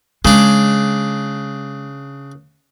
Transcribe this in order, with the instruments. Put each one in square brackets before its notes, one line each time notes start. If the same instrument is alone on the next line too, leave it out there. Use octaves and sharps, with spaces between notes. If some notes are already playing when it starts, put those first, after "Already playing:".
[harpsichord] C#3 D4 [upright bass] G#3